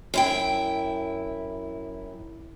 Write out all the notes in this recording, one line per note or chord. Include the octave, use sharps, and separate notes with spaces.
F#2 E4 G5